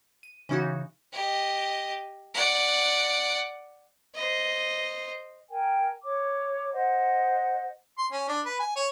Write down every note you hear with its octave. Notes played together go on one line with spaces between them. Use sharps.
D#7
C#3 E3 C#4 D#4 F#4
G4 D#5
D5 F#5
C5 D#5
A#4 G5 G#5
C#5 D6
C5 D#5 F#5
C6
C#4
D4
B4
G#5
C#5